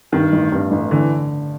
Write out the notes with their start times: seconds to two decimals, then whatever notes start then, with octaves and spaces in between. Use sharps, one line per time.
0.12 G2 D#3
0.33 A1
0.52 G2
0.71 A1
0.91 D3 E3